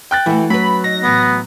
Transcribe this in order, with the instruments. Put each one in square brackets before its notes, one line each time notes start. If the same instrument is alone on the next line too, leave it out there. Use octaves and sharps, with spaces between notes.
[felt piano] G5 F#6 A6
[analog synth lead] E3 [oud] A3 F#4
[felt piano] F#3 [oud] C#4 B4 [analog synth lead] B5
[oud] D#4 [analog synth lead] A#6
[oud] A2 E3 [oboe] B3